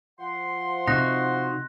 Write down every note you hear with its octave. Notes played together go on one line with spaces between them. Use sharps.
F3 F#5 C6
C3 D#4 F#4 C#6 F#6 A#6